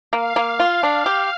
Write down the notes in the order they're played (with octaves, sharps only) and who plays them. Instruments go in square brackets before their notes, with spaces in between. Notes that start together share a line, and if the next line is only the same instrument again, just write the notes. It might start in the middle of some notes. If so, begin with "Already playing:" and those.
[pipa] A#3 [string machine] F5
[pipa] A#3
F4
D4
G4